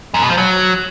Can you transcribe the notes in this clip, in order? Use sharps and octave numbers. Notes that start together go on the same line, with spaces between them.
F#2
B2
F3
F#3